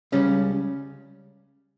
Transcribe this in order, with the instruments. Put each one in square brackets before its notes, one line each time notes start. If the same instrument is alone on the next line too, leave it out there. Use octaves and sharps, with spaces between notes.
[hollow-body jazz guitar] C#2 C#3 G3 C#4